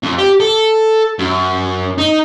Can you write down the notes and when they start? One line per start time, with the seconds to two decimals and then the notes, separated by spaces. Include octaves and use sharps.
0.03 F2
0.19 G4
0.40 A4
1.19 F#2
1.98 D#4